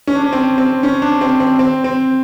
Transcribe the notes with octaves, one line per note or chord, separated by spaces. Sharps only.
C#4
D4
C#4
C4
C4
C#4
D4
C4
C4
C4
C4